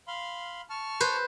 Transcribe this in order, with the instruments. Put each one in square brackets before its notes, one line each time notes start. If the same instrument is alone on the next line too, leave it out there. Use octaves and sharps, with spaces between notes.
[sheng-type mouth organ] F5 B5 C6
A5 C#6 F6
[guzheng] B4 C5